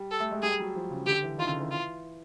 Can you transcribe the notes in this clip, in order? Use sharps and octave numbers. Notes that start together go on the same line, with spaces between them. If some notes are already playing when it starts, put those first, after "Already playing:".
Already playing: G3
A4
A3
G#3
G3 G#4
F#3
F3
C#3
D3 G4
E3
D#3 F4
C#3
D3
E3
F4